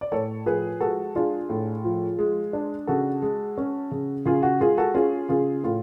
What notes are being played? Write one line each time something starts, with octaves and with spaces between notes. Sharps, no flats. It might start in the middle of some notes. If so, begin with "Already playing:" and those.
D5
A2 A4 C#5
F3 G#4 B4
G#3 F#4 A4
D4 F4 G#4
A2
F3
G#3
D4
C#3 F#4 A4
G#3
C#4
C#3
C#3 F4 G#4
F#4
G#3 F4 G#4
F#4 A4
C#4 F4 G#4
C#3 F4 G#4
A2 F4